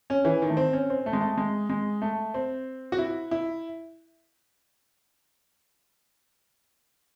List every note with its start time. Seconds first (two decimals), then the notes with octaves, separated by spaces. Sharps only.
0.10 C#4
0.25 E3
0.42 D#3
0.50 A3
0.57 C4
0.73 C#4
0.90 C4
1.06 A3
1.13 G#3
1.21 A3
1.37 G#3
1.69 G#3
2.02 A3
2.34 C4
2.92 F#4
2.98 E4
3.31 E4